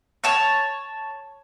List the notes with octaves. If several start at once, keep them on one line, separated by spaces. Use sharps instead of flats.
C#5 A5